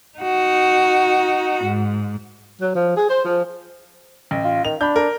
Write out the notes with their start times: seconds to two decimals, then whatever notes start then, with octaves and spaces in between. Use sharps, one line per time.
0.18 D#4 F#4
1.64 G#2
2.60 F#3
2.75 F3
2.96 G#4
3.08 C5
3.25 F3
4.31 A1
4.44 F4
4.65 D#3 F7
4.81 D4 B5 G6
4.96 A#4